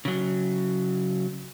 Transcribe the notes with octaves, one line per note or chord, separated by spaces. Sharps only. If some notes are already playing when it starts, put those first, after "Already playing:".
C#3 F#3